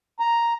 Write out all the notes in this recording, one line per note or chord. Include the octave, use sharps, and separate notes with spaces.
A#5